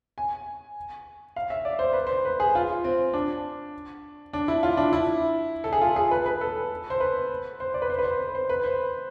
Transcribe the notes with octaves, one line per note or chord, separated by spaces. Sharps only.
G#5
F5
E5
D5
C5
B4
C5
B4
G#4
F4
C4
D4
D4
E4
F4
D4
E4
A4
G#4
F4
G#4
B4
B4
A4
C5
B4
C5
D5
B4
C5
B4
C5
B4
C5
B4
C5